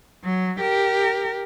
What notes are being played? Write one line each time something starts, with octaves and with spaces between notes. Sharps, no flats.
F#3
G4 A#4